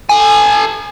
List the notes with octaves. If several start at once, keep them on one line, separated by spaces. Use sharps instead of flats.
A4 G#5